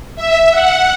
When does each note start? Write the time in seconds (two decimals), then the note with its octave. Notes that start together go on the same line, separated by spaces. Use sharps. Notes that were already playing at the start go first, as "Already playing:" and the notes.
0.16 E5
0.51 F#5